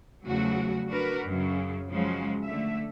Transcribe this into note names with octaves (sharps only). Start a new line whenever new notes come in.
E2 C#3 F3 F#3 A3 F#4
D4 F#4 A#4 B4
F#2 C#3
C#3 F3 F#3 G#3
D3 A3 E5